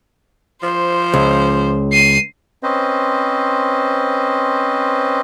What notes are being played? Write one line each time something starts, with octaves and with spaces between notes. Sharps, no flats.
F3 C5
C#2
C7 D#7
C4 C#4 B4 C5 D#5